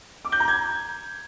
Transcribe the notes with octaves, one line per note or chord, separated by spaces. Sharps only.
D6
G6
A#5
G#6